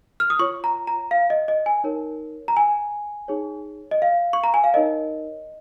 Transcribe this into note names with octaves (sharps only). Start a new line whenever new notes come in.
F6
D#6
F4 C#5 C#6
A#5
A#5
F5
D#5
D#5
G#5
D#4 A#4 C#5
A#5
G#5
D#4 G#4 C#5
D#5
F5
C#6
A#5
G#5
F5
D#4 A#4 C#5 D#5